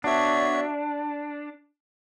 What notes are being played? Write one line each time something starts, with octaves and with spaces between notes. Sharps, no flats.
B3 D4 F#4 C#5 E5